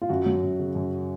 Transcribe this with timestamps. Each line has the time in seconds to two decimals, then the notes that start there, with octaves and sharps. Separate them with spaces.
0.02 F4
0.09 F#2 F#4
0.26 F#3
0.43 F#2
0.59 C#3
0.75 F#2